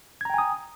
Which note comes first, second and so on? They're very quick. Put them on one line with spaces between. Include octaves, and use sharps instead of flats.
G#6 A#5 G5 G#5 D#6